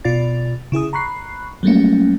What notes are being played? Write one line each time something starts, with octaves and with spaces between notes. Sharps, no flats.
B2 F4 D5 A6
C#3 E4 G#4 D#6
A#5 B5 C#6 F#6 C7
F#3 G3 A3 A#3 C#4